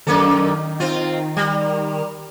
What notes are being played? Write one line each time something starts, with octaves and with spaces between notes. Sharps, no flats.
F#2 D#3 A#3 A4
C4 F4
G3